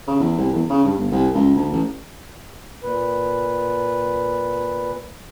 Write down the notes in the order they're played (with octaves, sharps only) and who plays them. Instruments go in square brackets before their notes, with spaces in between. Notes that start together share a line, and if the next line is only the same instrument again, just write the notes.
[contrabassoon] C#3
E2
C2
E2
C#3
G2
G1
C2
C#2
D2
A1
[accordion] A#2 B4